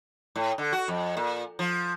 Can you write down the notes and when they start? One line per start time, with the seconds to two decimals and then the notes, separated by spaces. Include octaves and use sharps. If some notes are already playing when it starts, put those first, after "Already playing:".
0.36 A2
0.58 D3
0.72 F#4
0.88 F2
1.17 A#2
1.59 F3